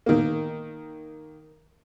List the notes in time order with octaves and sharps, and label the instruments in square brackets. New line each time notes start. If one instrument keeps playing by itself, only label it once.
[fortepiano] D#3 A#3